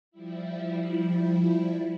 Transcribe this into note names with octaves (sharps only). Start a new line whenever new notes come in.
F3 G3 E4